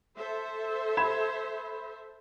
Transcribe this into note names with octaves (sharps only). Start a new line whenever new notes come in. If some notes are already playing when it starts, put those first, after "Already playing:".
A4 C5 E5
B5 G#6 E7